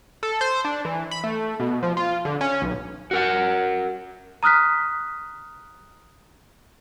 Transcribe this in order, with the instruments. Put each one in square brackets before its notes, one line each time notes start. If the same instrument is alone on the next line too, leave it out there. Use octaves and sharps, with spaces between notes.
[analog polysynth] A4
C5
D4
E3
B5
A3
B2
F3
F4
D3
C#4
B1
[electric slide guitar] F#4 A#4 F#5
[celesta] A#5 D#6 F6 F#6 B6